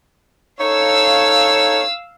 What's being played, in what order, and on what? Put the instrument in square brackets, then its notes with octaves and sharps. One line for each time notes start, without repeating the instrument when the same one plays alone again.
[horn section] D#4 A4 C#5 [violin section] F5 E6